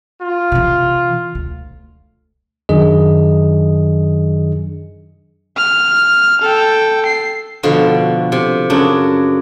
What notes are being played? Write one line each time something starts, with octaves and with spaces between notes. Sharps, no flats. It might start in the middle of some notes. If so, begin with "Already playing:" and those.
F4
C3 E3
D2
F#2 D#3 F#3 D4 G#4 D#5
F6
A4 G5
C7
B2 D3 F3
C3
F#2 C#3 D4